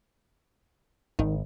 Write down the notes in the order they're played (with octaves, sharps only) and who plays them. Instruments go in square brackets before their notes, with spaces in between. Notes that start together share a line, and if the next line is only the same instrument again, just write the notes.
[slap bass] G#1 [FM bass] D#3